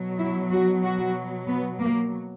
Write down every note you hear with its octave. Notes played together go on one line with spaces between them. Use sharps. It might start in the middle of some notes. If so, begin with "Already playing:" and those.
Already playing: B2 F#3
E4
F#4
F#4
B3
A#3